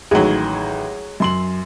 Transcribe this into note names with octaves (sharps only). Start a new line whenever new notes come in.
A1 D#3 F#3 G#3
F#2 C6 F#7